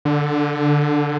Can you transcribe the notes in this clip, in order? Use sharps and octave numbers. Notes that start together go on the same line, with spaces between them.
D3